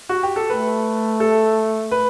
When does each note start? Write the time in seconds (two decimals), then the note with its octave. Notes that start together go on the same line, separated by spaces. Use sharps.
0.09 F#4
0.23 G4
0.36 A4
0.50 A3 B4
1.20 A4
1.91 B4